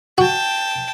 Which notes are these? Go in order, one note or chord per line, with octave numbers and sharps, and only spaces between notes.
F#4 G5 A5